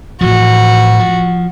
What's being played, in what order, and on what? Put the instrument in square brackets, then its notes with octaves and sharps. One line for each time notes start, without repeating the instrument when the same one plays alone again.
[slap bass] A2 E3 F3 [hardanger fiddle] F#4
[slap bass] F3